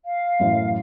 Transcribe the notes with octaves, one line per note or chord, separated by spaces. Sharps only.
F5
F#2 A2 E3